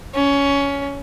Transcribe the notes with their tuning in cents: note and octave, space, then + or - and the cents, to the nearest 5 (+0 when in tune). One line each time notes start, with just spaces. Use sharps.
C#4 +15